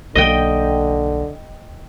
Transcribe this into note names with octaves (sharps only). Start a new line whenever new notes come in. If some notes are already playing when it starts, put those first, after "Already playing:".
B1 D3 A#3 D#5 G5